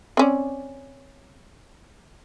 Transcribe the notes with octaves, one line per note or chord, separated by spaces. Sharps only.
C4 C#4 D5